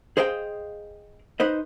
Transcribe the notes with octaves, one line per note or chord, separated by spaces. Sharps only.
G#4 C5 D#5 F5 G5
D#4 B4 C5 D#5